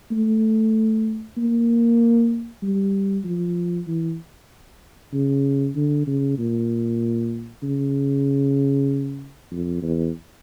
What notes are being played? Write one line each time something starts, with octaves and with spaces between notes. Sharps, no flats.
A3
A#3
G3
F3
E3
C#3
D3
C#3
A#2
C#3
F2
E2